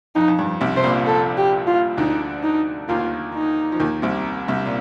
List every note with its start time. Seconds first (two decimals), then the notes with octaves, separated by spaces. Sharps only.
0.15 F2 D#4
0.28 F2
0.39 G2
0.61 C2 C3
0.76 C3 C5
0.84 A#1 A#2
1.07 A4
1.37 G4
1.67 F4
1.97 D2 D3 D#4
2.43 D#4
2.89 D#2 D#3 F4
3.34 D#4
3.72 F3
3.80 D#2 D#3
4.02 C2 C3
4.48 C2 C3
4.65 A#2